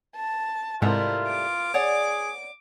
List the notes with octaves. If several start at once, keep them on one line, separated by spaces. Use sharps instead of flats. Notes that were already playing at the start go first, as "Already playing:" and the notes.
A5
G#2 C3 G3 A3 E4 F4 A#4
D6
G#4 C#5 D5 F#5